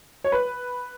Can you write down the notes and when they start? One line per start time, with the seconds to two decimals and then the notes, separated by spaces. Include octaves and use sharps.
0.24 C#5
0.32 B4